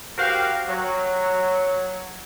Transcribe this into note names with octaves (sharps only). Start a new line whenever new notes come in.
F#4 G4 A#4 C5 F5
F#3